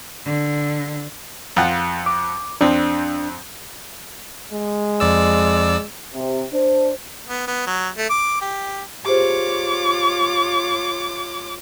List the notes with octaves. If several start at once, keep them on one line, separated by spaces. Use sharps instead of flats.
D3
F2 F4 F#5
D6
F2 C4 D4
G#3
F2 D5 E6
C3
D4 C5
B3
B3
F#3
A3
D6
G4
F4 G4 G#4 C5 C#5 D6